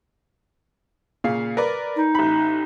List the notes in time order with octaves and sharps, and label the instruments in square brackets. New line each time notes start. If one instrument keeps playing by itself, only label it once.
[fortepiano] A#2 C#3 F5
A#4 B4 D5
[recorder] D#4
[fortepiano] A1 B5